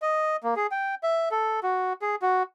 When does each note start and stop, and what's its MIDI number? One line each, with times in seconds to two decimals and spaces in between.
0.02 0.37 75
0.43 0.54 58
0.56 0.67 68
0.71 0.95 79
1.03 1.29 76
1.31 1.60 69
1.63 1.93 66
2.02 2.15 68
2.22 2.43 66